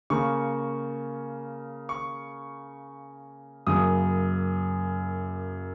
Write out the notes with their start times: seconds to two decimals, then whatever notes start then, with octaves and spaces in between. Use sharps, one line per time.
0.10 C#3 A#3 C#6
1.89 C#6
3.67 F#2 C#3 A#3 D#6